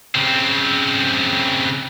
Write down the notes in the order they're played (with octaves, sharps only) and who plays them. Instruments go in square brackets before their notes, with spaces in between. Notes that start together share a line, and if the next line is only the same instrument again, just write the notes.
[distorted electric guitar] C#3 C4